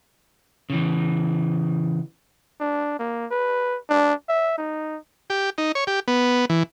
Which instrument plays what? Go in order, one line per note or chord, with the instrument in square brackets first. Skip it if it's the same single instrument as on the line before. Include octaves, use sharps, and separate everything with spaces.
[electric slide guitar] C#3 E3
[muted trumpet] D4
A#3
B4
D4
E5
D#4
[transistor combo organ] G4
D#4
C#5
G4
B3
E3